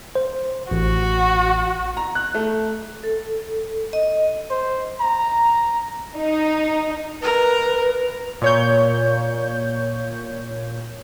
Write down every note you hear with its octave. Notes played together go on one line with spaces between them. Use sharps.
C5
A1 F#4
A#5
F#6
A3
A4
D#5
C5
A#5
D#4
A#4 B4
A#2 C#5 G6